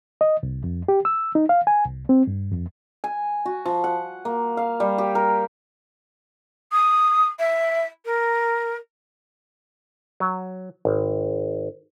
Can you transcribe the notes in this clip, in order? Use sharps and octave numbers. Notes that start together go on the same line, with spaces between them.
D#5
C2
F2
G4
E6
D#4
F5
G#5
C2
C4
G2
F2
G#5
F#4
F3
F#5
A#3
F5
G3
G4
A#4
D#6
E5
A#4
F#3
G#1